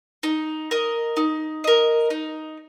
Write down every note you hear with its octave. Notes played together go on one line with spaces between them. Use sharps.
D#4
A#4 D#5
D#4
A#4 D#5
D#4